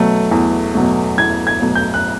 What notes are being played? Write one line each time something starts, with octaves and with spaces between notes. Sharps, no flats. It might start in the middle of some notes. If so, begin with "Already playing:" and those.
Already playing: B2 F#3 A3
E2
B2 F#3 A3
E2 G#6
G#6
B2 F#3 A3
G6
F#6